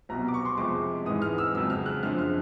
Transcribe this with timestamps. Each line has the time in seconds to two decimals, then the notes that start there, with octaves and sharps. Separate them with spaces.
0.09 C2 B2 F#3 A#5
0.28 D6
0.34 C#6
0.45 C6
0.57 F2 C3 F3 G#3 D6
1.06 G#2 E3 G#3 D#6
1.22 F6
1.38 E6
1.54 F2 C#3 F#3 E6
1.70 F6
1.86 F#6
2.03 F#2 D3 F3 G#3 F6
2.19 F6